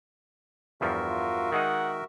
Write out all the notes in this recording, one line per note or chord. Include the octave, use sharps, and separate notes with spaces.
E2 G2 F3 F#4 A#4 E5
F4
D#3 G#3 D#4 F#5